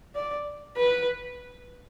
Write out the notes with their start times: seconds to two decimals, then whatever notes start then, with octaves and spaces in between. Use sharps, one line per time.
0.16 D5
0.77 B4